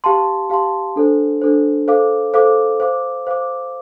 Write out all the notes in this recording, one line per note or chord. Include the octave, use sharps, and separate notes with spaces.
G4 F5 A5 C6
G4 F5 A5 C6
D4 A4 C5
D4 A4 C5
A4 C5 F5 D6
A4 C5 F5 D6
C5 F5 D6
C5 F5 D6